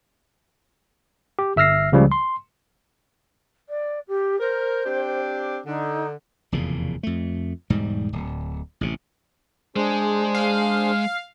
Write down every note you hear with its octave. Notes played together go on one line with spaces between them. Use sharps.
G4
G1 E5 E6 F6 A#6 C7
C#2 C#3 F3 G3
C6
D5
G4
A#4 C5
C4 D4 G4
D3 D#4
F1 E2 A#2 C#3
F2 A3
E1 G#2 G3
D1
A1 C3
G#3 D4 G#4 C5
F5